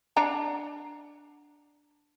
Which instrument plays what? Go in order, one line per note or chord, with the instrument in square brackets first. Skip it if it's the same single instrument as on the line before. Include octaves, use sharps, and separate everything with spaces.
[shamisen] D4 F#5 A#5